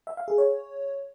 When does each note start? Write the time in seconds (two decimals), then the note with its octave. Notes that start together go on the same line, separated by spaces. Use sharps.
0.07 E5
0.17 F5
0.28 G#4
0.38 C#5